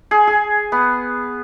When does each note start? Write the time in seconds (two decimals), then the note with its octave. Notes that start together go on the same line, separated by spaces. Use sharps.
0.11 G#4
0.27 G#4
0.72 B3